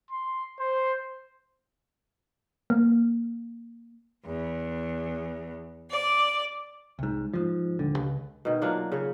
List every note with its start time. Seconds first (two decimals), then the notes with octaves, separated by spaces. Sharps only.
0.11 C6
0.59 C5
2.70 A#3
4.25 E2
5.90 D5
6.99 C2 G#2
7.34 G#2 F3
7.79 D#1 D3
7.97 C#2
8.45 B2 D#3
8.62 F#3 A#3 D4 F4
8.92 C#3 C#5